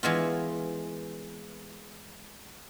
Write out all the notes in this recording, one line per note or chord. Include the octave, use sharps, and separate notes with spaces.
E3 G#3 B3 F4